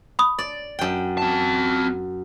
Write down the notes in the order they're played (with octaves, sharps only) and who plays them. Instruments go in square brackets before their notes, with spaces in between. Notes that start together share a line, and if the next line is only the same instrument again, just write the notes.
[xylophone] B5 D#6
[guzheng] D5
F#2 G5
[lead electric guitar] C4 A5